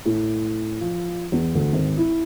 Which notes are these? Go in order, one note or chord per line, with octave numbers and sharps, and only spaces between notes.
A2
F3
E2
D2
G#1
E4